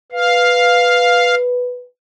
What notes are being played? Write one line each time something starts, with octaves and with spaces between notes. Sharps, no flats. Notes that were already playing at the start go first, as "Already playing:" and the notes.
B4 F5